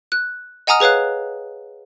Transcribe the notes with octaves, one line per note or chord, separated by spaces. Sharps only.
F#6
D#5 F#5 G#5 A#5 D#6 F6
G#4 B4 C#5 F5 F#6